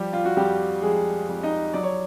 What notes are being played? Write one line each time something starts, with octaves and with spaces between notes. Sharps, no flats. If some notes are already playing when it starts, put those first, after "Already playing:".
Already playing: F3 G3 G4
F4
F#4
F2 G3 G4
F3 G#3 G#4
F2
D#4 D#5
F#3 D5
C#5